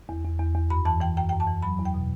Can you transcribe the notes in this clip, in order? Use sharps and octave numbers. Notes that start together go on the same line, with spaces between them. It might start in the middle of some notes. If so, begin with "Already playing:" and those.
E2
E2
E2
E2
F#2 B5
E3 A5
E3 G5
F#2 G5
F#2 G5
A5
E3
F#3 B5
E2
G5
B2